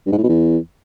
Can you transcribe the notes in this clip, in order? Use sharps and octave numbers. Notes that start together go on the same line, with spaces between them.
G2
G#2
A2
B2
E2